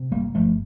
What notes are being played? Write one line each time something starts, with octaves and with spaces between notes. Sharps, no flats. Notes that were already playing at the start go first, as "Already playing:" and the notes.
Already playing: C3
G1 G3 A#3
G1 F3 A3